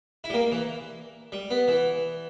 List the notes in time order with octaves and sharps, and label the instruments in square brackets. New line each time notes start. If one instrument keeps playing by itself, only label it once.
[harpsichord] E4
G3
A#3
E3
G3
B3
E3